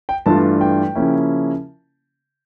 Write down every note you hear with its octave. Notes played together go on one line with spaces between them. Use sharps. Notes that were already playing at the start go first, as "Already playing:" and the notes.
G5
G2 E3 A3 D4 F4 A5
G5
C#3 F3 A#3 C#4 E4